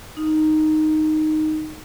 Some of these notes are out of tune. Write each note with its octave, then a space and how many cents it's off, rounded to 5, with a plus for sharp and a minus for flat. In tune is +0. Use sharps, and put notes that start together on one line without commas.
D#4 -5